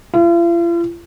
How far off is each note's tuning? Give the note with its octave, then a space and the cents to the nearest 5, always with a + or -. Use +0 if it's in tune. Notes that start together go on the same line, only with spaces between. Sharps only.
F4 -45